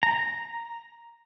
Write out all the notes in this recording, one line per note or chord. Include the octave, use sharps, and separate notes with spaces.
A#5